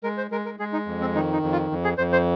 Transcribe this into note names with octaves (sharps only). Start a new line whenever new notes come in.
G#3 A#4
C5
G#3 A#4
A#4
G#3 G#4
D#4
F2
C4
D#3 D#4
D#4
F2
F4
F2
G#4
F2 C5
C5